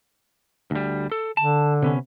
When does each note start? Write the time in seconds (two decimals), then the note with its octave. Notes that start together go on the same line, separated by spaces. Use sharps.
0.71 D2 G3
1.12 A4
1.37 D3 A5
1.82 C3 B3 C#4